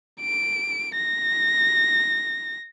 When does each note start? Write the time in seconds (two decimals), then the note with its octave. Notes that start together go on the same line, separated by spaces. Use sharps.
0.21 D7
0.96 A#6